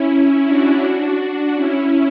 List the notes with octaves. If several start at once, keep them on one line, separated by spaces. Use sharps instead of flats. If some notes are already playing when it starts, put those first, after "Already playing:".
Already playing: C#4 E4
D4 F#4
D4
C#4 E4